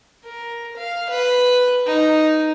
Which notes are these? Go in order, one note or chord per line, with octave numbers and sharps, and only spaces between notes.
A#4
F5
B4
D#4